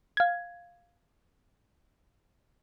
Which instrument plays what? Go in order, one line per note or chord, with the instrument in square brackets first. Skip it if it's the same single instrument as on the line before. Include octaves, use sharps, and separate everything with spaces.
[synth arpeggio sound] F5 G#6